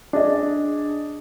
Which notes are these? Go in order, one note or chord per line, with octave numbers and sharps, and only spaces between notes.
D4 G#4 D#5